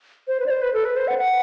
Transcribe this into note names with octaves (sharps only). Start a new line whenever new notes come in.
C5
B4
D5
C5
B4
A4
B4
C5
F#5
F#5